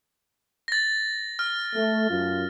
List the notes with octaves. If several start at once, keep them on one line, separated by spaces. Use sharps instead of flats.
A6 A#6
F6
A3
F#2 F4